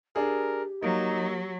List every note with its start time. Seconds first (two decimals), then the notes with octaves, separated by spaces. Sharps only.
0.16 D4 G4 G#4 A#4
0.82 F#3 A#3 D#4